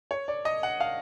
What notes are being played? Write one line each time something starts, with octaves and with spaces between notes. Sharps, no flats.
C#5
D5
D#5
F#5
F5